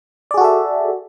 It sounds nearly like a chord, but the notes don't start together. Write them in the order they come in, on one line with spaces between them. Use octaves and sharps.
D5 G#4 F#4 A4 E5